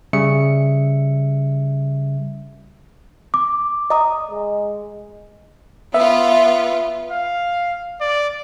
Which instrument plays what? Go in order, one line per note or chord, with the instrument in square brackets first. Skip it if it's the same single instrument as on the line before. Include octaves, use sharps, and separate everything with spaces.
[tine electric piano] C#3 G3 E5 C#7
[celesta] D6
[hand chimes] D#5 A#5 D#6
[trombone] G#3
[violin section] B3 F4 [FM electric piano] E5
[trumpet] F5
D5